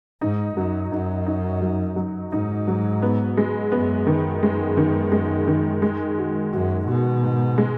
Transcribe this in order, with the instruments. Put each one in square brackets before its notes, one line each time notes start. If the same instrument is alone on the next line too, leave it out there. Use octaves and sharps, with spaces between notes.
[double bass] G#2 [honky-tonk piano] D#4
[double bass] F#2 [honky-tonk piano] F#3
[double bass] F#2 [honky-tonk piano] D#4
[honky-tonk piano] D#4
F#3
F#3
[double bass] G#2 [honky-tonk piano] D#4
[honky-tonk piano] F#3
B3
G#3
[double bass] F#2 [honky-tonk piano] B3
[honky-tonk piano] D#3
G#3
D#3
G#3
D#3
G#3
F#4
[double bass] F#2 [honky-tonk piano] F#4
[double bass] B2 [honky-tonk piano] F#4
[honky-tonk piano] G#2
G#3